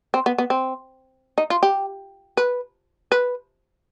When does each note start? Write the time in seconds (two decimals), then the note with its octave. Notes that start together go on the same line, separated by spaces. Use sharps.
0.14 C4
0.26 B3
0.38 B3
0.50 C4
1.38 D#4
1.50 F4
1.63 G4
2.37 B4
3.12 B4